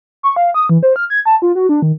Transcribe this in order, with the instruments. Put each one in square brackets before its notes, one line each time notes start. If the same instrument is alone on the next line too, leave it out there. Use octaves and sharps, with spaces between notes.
[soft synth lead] C#6
F5
D#6
E3
C5
F6
G#6
A5
F4
F#4
D4
D#3